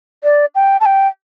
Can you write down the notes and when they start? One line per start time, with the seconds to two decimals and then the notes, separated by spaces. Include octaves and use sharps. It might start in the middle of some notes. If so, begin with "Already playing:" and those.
0.24 D5
0.55 G5
0.80 A5
0.86 G5